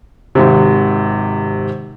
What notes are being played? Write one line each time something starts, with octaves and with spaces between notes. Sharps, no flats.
G#1 C3